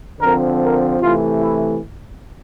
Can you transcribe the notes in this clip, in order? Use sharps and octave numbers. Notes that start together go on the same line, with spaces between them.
D3 F3 C4 A#4
A#4
C3 E3 A3 F4
E4